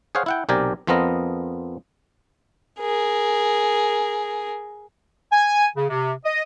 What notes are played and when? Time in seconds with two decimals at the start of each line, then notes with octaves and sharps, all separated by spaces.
0.15 G#4 C5 C#5 F5 F#5
0.26 E4 F#5 G5
0.49 B1 C3 G4 A#4 D5 G#5
0.87 F2 F3 B3 C4 A#4 D#5
2.79 G#4 A#4
5.32 G#5
5.76 C#3
5.90 C3
6.25 D#5